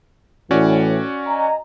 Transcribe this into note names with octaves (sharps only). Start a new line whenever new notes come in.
A2 E3 C#4 F#4 D5
D#5 G#5 A#5